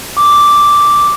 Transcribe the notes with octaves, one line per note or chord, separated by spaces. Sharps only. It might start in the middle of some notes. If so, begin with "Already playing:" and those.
D6